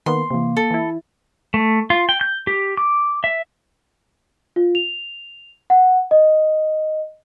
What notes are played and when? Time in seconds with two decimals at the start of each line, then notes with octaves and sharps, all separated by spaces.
0.06 D#3 A#3 B3 C6
0.31 C3 E3 A#3
0.57 A4
0.71 E3 E4
1.54 A3
1.90 F4
2.09 G5
2.21 G6
2.47 G4
2.77 D6
3.24 E5
4.56 F4
4.75 F7
5.70 F#5
6.11 D#5